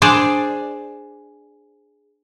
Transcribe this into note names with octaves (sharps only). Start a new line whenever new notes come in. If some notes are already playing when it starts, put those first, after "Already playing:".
D4 G#4 C5 D5